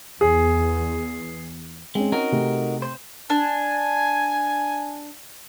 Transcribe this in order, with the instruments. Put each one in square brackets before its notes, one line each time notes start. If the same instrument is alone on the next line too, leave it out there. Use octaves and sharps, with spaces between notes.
[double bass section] E2 [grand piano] G#4
[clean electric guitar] G#3 [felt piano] C4 C#4
[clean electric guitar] D#4 F#4 A#4
[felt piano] C3 A3
[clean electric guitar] C5
[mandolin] D4 [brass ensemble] G#5